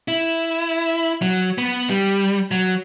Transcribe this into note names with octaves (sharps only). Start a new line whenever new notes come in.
E4
F#3
B3
G3
F#3